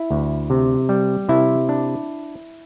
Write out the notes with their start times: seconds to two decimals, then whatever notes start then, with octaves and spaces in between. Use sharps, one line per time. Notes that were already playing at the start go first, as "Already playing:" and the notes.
Already playing: E4
0.11 D2
0.50 C3
0.89 G3
1.29 C3 E4
1.69 D4